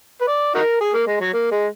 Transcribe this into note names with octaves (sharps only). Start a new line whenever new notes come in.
B4
D5
D#4 F#4 A#4
G#4
A#3
G#3
F#3
A#3
G#3